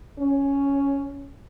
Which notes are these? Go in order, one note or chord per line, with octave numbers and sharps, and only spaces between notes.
C#4